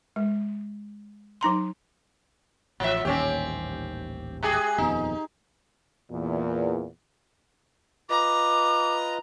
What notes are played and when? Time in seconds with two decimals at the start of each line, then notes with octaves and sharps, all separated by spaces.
0.16 G#3
1.41 F#3 D#4 A#5 C6
2.80 A1 F3 E5
3.05 D#1 A1 D#2 C4 C#4 G4
4.43 G#3 G4 G#4
4.78 D#1 F2 B3 D#4
6.11 E2 A#2
8.10 F4 B4 D#5 A#5 D6